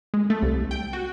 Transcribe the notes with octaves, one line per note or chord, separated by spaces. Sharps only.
G#3
A3
C2
G5
F#4